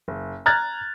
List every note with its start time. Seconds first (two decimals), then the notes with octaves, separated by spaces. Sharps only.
0.08 F#1
0.46 A#5 F6 F#6 G#6 A6